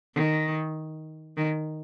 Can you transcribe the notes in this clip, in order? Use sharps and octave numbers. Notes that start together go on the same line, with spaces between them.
D#3
D#3